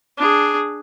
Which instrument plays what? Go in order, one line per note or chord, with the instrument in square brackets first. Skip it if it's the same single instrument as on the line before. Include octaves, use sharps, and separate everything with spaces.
[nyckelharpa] D4 G#4